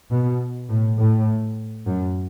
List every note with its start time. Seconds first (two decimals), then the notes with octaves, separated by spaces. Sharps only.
0.11 B2
0.69 A2
0.99 A2
1.87 F#2